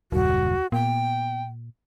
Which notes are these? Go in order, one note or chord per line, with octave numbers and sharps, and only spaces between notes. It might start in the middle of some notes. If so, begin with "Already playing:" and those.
F#1 D#2 A#2 G3 F#4
A#2 B3 G5